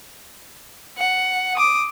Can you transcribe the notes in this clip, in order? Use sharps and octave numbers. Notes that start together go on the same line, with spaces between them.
F#5
D6 D#6